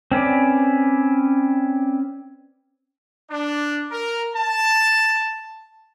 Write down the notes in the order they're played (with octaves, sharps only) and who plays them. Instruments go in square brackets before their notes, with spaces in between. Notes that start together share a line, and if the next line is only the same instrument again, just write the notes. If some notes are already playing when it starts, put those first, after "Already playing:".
[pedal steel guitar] C4 C#4 B4 D5
[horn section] D4
A#4
A5